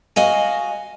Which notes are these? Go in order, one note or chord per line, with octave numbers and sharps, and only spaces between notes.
F#4 D#5 F5 G#5